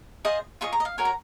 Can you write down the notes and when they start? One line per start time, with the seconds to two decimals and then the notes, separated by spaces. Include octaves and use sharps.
0.25 F4 G#4 C5 D#5
0.61 F4 G#4 D#5 C#6
0.73 A#5
0.80 D#5
0.85 F5
0.98 F#4 A#4 C#5 G#5
1.05 A#5